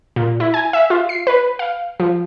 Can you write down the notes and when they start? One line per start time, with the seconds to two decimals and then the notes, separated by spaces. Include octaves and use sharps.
0.16 A#2
0.40 E4
0.54 G#5
0.73 E5
0.90 F4
1.09 C7
1.27 B4
1.59 F5
2.00 F3